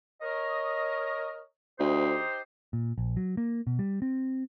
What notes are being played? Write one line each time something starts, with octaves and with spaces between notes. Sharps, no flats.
A#4 C#5 D#5
D2 D#4 G4 C5
A#2
A#1
F#3
A#3
B2
G3
C4